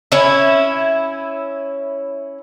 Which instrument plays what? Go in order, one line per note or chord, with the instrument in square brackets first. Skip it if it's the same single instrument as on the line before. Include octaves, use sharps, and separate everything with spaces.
[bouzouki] C#4 E4